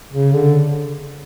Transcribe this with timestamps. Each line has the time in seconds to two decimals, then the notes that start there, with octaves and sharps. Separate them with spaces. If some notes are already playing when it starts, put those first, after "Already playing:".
0.13 C#3
0.33 D3